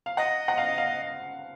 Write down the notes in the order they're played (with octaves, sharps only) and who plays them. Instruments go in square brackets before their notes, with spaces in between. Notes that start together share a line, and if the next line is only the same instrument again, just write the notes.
[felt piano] F5
[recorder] D#5 [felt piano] F#5
[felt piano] F#5
F5
F5